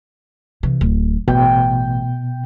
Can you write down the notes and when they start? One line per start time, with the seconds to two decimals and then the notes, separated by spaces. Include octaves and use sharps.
0.63 C3 E3
0.81 D1
1.28 A1 B2 G5